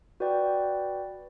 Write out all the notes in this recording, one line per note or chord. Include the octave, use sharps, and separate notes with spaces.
F#4 B4 D5 G5